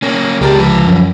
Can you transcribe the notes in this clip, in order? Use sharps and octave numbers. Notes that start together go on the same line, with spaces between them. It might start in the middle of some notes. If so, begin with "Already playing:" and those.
A#3 C#4
C#2 G#3 G4 A#4 A5
F3 B4
F#2